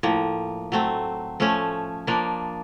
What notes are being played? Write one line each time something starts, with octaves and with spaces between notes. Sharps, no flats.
A2 F3 A#3
F#3 A3 C4
F3 A3 C#4
F3 A#3 D4